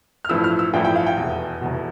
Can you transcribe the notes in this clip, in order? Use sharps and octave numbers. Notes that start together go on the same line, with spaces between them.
F6
A1 G2 F3 A3 E4 E6
F6
E6
A1 G2 F3 A3 E4 G5
G5
F5
G5
F1 E2 B2
F1 E2 B2